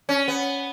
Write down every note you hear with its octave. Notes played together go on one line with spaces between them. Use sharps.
C#4
B3